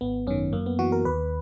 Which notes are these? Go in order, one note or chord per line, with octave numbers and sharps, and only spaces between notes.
G#1 B3
F#2 D#3 C#4
F#2 A#3
B3
E3 F#4
A#4
D#2 B4